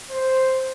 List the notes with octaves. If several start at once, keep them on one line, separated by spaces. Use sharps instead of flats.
C5